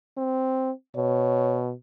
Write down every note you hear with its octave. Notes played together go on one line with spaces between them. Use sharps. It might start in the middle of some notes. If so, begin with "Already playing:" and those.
C4
B2 C#5